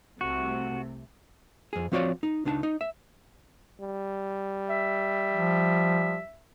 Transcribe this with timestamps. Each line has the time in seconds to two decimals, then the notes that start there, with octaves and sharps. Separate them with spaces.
0.21 C2 C3 A3 F#4
1.73 F2 G#4
1.92 F3 C4 F#4 C#5 D5 F5
2.23 D#4
2.45 C#2 D4 D#4 G#5 A5
2.63 D#4
2.81 E5
3.81 G3
4.70 E5
5.32 F3